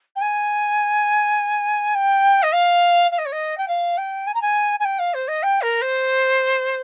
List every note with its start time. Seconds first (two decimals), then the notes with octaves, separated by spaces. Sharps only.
0.16 G5
0.21 G#5
1.95 G5
2.43 D#5
2.52 F5
3.11 F5
3.18 D#5
3.25 C#5
3.32 D#5
3.58 G5
3.68 F5
3.97 G5
4.27 G#5
4.34 A#5
4.42 G#5
4.80 G#5
4.85 G5
4.99 F5
5.14 C5
5.28 D#5
5.43 G5
5.62 A#4
5.81 C5